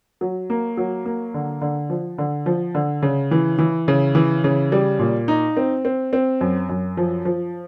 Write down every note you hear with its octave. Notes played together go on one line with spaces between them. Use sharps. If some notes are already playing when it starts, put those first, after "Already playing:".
F#3
A#3
F#3
A#3
D3
D3
F3
D3
F3
D3
C#3
E3
E3
C#3
E3
C#3
G3
A#2
D#4
C4
C4
C4
F#2
F#2
F3
F3